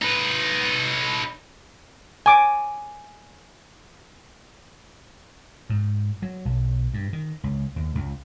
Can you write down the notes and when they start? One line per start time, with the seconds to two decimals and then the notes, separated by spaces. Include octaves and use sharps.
0.02 D#4 B4
2.26 G#5 D6
5.70 G#2
6.22 F#3
6.45 B1
6.94 G2
7.13 D#3
7.44 C#2
7.76 D#2
7.95 C#2